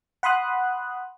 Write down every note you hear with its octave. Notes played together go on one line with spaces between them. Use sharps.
F#5 B5 C6 D#6 F#6